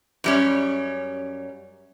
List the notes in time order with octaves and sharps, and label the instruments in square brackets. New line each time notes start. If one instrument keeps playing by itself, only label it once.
[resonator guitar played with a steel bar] F#2 G3 C#4